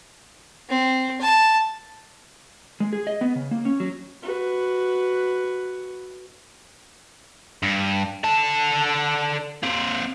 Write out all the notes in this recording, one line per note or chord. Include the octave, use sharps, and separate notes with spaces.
C4
A5
G#3
G#4
D#5
B3
C#3
A#3
C#4
F#3
F#4 B4
G2
D3 A5
A#3 C4